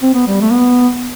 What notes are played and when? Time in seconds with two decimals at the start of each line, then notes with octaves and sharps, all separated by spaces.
0.02 C4
0.14 B3
0.27 G3
0.41 A3
0.52 B3